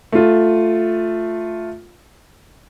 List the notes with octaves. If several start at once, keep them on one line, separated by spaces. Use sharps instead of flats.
A3 F4